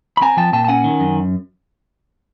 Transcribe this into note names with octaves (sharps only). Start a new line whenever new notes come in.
B5
C4 G#5 A#5
F3 G5 A5
A#2 G5 A5
A5
C#4 F#5 G#5
D#3
F#2